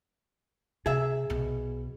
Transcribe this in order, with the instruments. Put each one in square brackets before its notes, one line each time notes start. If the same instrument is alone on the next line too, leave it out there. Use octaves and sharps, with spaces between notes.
[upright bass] C3 [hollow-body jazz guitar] G#4 E5
[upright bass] B1 B2